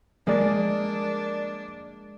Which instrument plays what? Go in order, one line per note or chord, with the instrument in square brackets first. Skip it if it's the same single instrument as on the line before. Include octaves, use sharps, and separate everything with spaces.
[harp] G#3 [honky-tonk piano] A#3 D5 [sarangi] D4